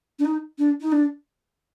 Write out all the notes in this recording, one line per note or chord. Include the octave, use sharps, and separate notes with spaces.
D4
D#4
D4
D#4
D4